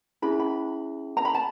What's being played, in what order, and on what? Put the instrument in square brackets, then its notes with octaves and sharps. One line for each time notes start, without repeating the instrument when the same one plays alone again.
[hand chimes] C#4 E4 G#4 [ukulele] B5
[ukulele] B5
A#5
B5
A5